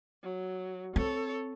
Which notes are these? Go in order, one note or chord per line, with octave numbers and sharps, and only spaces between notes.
F#3
C4 A4 C#5